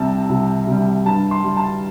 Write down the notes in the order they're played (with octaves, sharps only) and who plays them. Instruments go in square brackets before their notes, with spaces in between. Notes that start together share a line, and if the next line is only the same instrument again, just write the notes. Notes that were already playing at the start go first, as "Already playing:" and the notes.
Already playing: [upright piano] C2 C3 G3 A5
C2
C3 G3
G2 A5
C6
G3
A5